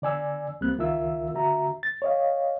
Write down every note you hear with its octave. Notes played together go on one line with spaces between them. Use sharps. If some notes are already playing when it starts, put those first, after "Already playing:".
D3 D5 G#5 E6
C#2 G3 A#3 C4 F#6
C#2 D#3 F4 A#4 E5 E6
D3 F#4 E5 A#5
A6
C#5 D#5 F5